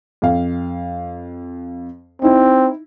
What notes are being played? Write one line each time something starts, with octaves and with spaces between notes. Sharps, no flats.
F2 F5
C4 D#4 E4